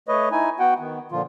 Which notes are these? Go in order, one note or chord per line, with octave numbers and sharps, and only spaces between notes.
A3 B4 C#5 D#5
D#4 E4 G#5
B3 F#4 F#5 G5
D#3 B3
A#2 D3 F3 F4